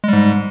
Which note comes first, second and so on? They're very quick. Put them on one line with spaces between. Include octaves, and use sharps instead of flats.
G#3 G3 G#2